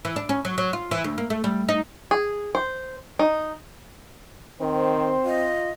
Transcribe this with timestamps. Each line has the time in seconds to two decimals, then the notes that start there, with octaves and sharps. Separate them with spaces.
0.05 E3
0.16 D4
0.29 C#4
0.45 F#3
0.58 F#3
0.73 F4
0.91 E3
1.04 D2
1.18 A#3
1.30 A3
1.44 G3
1.69 D#4
2.11 G#4
2.55 C5
3.19 D#4
4.61 D#3 C4 C5
5.25 F4 D#5